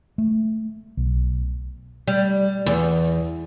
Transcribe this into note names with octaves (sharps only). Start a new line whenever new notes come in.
A3
B1
G3
E2